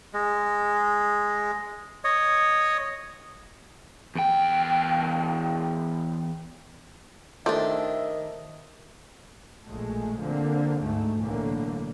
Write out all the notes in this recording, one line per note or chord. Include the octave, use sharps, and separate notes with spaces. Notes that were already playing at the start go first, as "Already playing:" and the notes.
G#3
C#5 D#5
E2 G5
D#3 F3 A3 D4 G4 E5
A#1 B2 G#3 A3
D3 F3 A#3 C4
D2 G#2 A3
B1 A2 D3 E3 A#3